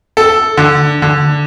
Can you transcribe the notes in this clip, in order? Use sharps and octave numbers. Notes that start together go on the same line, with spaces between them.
A4
D3
D3